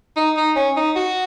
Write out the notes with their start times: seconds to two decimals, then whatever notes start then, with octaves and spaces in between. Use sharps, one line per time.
0.16 D#4
0.37 D#4
0.56 C#4
0.76 D#4
0.96 F#4